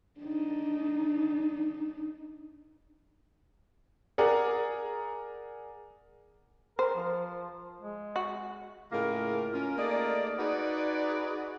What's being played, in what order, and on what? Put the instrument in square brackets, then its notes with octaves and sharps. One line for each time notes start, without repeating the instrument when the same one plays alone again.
[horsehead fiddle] D4 D#4
[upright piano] G#4 A#4 D5 F#5
[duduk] A#4 [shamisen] C5
[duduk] F3
G#3
[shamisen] F#4
[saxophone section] A2 C#3 G#3 A#3 F4 A#4
C#4 F4 A#4
A3 A#3 D#4 G#4 D5
D#4 F#4 G#4 B4 D5